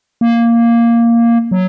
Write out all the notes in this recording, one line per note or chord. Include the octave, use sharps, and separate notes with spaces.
A#3
F#3